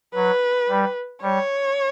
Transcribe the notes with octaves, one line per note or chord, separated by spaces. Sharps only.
F#3 B4
G3
G3 C#5